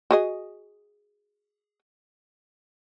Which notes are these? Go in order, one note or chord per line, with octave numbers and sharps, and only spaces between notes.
F#4 G#4 D#5